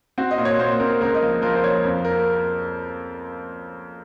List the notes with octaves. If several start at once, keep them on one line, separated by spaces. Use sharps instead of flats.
C4 F#4
D#5
A#2
C#5
A#2 C5
C4 A#4
C#2 A#4
D#5
F3
F3 A#4
C5
F3 C#5
F2
A#4